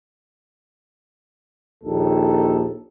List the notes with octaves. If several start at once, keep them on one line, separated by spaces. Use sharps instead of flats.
A#1 D#2 D#3 A4